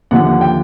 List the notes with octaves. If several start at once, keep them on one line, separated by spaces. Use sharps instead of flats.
D#2 D3 F3 F#5
F#5
G5